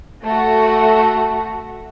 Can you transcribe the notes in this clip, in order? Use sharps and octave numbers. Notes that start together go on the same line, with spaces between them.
A3 F#4